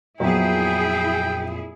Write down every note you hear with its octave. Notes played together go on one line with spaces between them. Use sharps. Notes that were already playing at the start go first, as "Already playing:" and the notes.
F2 A#2 F#3 B3 E4 G#4 G5